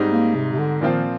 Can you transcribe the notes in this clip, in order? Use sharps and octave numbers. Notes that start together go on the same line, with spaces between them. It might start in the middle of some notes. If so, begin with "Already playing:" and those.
Already playing: G#2 G3 C4 D#4
A#3
C3
C3
D3
A#2 D#3 F3 C4 F4